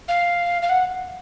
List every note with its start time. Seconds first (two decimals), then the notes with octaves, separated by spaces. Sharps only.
0.08 F5
0.62 F5
0.69 F#5